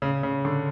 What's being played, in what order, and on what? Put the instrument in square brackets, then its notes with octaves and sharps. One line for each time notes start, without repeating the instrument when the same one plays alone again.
[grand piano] C#3
C#3
D3